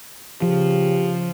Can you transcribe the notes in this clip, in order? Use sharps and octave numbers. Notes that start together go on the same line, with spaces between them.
C#3 F3 G4